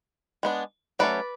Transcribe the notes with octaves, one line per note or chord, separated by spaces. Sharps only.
G#3 B3 D4
F#3 A3 C#4 B4 D5